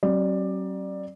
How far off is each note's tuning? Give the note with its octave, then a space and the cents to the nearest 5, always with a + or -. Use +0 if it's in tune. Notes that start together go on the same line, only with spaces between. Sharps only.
F#3 +40 C4 +45 D5 +15